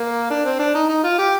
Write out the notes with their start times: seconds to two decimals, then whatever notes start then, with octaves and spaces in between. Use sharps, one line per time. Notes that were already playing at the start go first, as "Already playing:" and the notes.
Already playing: A#3
0.31 D4
0.45 C4
0.59 D4
0.75 D#4
0.89 D#4
1.04 F4
1.19 G4